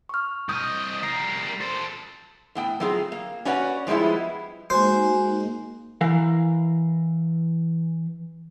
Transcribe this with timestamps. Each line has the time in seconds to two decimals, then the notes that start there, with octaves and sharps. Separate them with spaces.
0.09 C#6 F6
0.49 C2 D#5 D#6 G6
1.03 G3 A#4 C7
1.61 A4 C5
2.55 A2 B3 G5
2.80 F#3 A3 C4 F4 G#4
3.12 A#3
3.45 C#4 F#4 B4 C#5 D5 F#5
3.87 F3 G3 G#3 B3 E4
4.70 G#3 A#3 D#4 F#4 C5 G#5
6.01 E3 A#4 F5